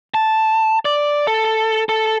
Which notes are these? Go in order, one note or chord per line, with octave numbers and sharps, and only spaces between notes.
A5
D5
A4
A4